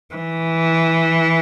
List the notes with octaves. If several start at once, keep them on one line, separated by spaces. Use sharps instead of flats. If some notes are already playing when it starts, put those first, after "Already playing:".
E3